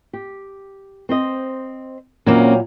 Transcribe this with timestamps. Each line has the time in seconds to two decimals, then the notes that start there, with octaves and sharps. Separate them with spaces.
0.13 G4
1.09 C4 C5 D#5
2.26 A#2 F#3 A#3 C4 C#4 E4